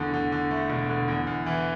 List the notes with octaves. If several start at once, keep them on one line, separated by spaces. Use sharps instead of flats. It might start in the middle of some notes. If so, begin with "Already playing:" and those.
Already playing: E2 D3 A3
D3
D3
A3
E1
D3
E2
E2
E3